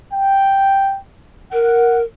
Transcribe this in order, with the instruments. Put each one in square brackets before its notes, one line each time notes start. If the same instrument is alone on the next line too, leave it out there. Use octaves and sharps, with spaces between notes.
[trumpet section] G5
[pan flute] A#4 [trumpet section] F#5